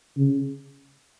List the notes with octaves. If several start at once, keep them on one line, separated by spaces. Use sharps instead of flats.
C#3